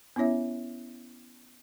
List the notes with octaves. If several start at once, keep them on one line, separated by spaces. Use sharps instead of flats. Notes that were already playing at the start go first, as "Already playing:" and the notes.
B3 C#4 E4 C#5 E5